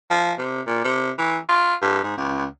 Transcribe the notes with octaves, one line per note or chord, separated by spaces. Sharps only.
F3
C3
A#2
C3
E3
F4
G2
G#2
C#2